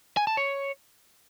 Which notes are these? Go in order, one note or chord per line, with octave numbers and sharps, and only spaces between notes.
G#5
A5
C#5